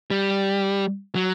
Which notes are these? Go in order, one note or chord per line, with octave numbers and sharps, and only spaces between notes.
G3
F#3